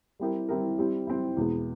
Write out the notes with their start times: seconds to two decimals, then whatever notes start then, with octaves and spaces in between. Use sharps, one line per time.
0.20 G3 C4 E4 G4 A#4
0.49 G3 C4 E4 G4 A#4
0.78 G3 C4 E4
1.07 G3 C4 E4
1.37 E2 B2 G#3 B3